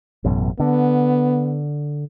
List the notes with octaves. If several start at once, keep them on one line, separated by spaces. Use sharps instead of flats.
A1 F#2 B2
D3 B3